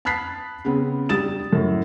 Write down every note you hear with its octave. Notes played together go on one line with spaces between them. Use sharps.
A5 B5 D#6 F#6 B6 C7
C#3 B3 C4
G2 G4 D#6 A6 E7
F#2 A2